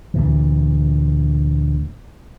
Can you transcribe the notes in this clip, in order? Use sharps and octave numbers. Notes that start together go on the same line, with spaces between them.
D2 A#2 E3